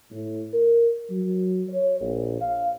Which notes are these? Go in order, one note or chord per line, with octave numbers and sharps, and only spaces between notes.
A2
A#4
F#3
C#5
A#1
F5